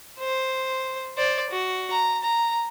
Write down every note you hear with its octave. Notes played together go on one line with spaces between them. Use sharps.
C5
C5 D5
F#4
A#5
A#5